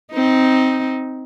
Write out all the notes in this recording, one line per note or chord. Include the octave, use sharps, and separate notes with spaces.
C4 D#4